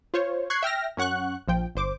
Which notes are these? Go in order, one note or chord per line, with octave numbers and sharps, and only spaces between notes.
F4 C5 C#5
C#6 F#6 G#6 C7
E5 G5 F6 A#6
F#2 C#4 F#5 C#6 F#6
A#1 F3 G5
G1 C5 D6